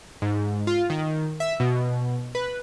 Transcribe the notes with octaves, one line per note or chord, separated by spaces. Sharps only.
G#2
F4
D#3
E5
B2
B4